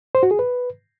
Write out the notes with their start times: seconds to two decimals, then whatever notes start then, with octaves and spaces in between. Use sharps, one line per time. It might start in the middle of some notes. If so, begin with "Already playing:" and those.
0.15 C5
0.23 F#4
0.31 G#4
0.39 B4